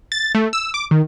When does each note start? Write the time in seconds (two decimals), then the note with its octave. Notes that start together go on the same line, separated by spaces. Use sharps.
0.12 A6
0.35 A3
0.53 E6
0.74 D6
0.91 D#3